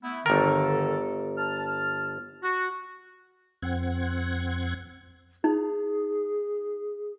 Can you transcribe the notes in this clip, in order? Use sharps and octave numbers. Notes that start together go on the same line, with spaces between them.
A3 B3 E4
G1 D3 D#3 A4 A#4
A5 F6
F#4
F2 C4 F#5 G#6
D#4 G#4